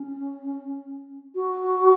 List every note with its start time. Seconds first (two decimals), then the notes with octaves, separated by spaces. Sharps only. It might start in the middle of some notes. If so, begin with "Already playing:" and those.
Already playing: C#4
1.35 F#4